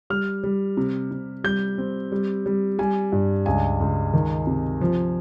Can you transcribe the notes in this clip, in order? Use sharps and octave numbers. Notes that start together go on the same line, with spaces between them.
G3 F6
G3
C3
C3
G3 G6
C4
G3
G3
G3 G#5
G2
C#2 G#5
C#2
D#3
C3
F3